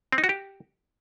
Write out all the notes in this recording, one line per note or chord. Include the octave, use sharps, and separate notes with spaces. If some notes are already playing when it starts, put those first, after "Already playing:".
C4
D#4
F#4
G4